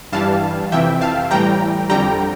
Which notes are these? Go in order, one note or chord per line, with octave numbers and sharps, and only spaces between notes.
G2 E3 G3 F5 A5
F2 C3 E3 E5 G5
F5 A5
A2 E3 G3 G5 A#5
F2 D3 G3 G5 A#5